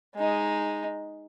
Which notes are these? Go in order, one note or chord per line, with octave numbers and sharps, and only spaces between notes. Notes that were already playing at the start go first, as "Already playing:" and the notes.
G#3 D#4